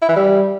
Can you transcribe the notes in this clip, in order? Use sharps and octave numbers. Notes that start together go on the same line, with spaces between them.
E4
E3
G3